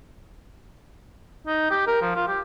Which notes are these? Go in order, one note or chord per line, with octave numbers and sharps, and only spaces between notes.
D#4
G4
A#4
F3
F4
G4